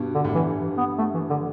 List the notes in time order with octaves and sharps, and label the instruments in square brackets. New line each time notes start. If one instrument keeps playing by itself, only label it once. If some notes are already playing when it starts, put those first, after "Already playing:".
Already playing: [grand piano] G2 B2
[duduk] D3
[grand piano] A2
[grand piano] G2 [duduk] E3
[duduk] B3
A3
E3
D3